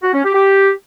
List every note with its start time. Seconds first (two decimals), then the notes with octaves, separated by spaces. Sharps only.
0.03 F#4
0.13 C#4
0.24 G4
0.34 G4